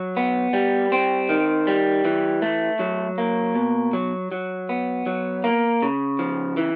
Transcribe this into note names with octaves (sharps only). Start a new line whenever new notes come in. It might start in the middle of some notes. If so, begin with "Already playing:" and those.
Already playing: F#3
B3
G3
C4
D#3
G3
E3
A3
F#3
A#3
B2
F#3
F#3
B3
F#3
A#3
C#3
F3
E3